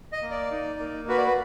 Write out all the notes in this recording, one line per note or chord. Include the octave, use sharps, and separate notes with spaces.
D#5
A#3
D5
D#4
A#3
F#4 B4
D5
B4